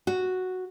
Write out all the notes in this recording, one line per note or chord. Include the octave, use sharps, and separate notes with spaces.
F#4